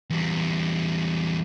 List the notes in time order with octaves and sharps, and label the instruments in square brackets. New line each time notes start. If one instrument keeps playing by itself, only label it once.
[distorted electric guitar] E2 G3